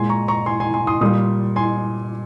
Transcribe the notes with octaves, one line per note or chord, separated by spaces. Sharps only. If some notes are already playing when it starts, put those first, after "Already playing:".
Already playing: A#2 G#3 G#5 C6
A#5 C#6
A#5 C#6
G#5 C6
G#5 C6
G#5 C6
C6 D#6
A#2 G3 A#3 C6 D#6
G#5 C6